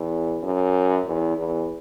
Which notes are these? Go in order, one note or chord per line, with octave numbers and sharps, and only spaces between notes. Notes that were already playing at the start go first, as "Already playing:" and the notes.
Already playing: E2
F#2
E2
E2